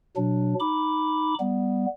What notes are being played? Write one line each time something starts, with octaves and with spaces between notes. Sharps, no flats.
B2 F#3 D4
D#4 B5 D6
G3 B3